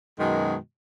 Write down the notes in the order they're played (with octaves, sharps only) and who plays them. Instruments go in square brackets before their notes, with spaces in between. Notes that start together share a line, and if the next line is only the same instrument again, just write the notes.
[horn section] F#2 B2 D#3 G#3